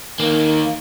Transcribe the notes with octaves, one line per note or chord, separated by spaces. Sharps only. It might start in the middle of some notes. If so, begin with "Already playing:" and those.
D#2 D#3 A#3